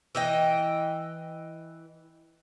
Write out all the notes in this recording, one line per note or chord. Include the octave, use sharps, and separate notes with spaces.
E3 D#5 G5